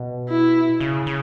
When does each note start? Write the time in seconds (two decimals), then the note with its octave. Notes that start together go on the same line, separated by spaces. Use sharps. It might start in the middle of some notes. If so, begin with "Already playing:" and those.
Already playing: B2
0.29 E4
0.80 C#3
1.07 C#3